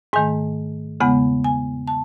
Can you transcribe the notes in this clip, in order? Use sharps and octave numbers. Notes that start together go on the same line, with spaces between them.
G#2 D#3 A3 G#5
E2 C#3 G#3 B3 F#5
G#5
A5